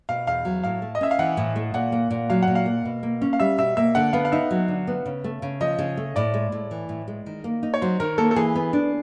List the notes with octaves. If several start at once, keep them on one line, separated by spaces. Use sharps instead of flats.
B2 F5
E2 F5
F#3
A2 F5
A3
D#5
C#4 E5
F5
E3 F#5
A2
A3
A#2 F#5
A#3
A#2
F#3 F5
A#2 F#5
F5
A#3
B2
A#3
C#4
F5
G3 E5
B2 E5
A#3 E5
D3 F#5
B3 F5
F5
D#4 E5
F#3
D3
B3
C#3
A3
C#3
F3 D#5
C#3
A3
A2 D5
G#3
A2
E3
A2
G#3
D#3
A#3
D#4
C#5
F#3 C5
D#3 A#4
A#3 A4
A4
E3 G#4
B3
D4